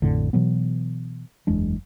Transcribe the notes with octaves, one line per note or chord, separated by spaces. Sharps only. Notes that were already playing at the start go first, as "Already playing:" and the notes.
A1 F2 A2 D3
B2 E3 F#3 B3
F#1 E2 G#3 D4